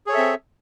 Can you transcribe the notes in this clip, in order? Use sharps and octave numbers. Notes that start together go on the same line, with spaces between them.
C4 G#4 A4 C#5 E5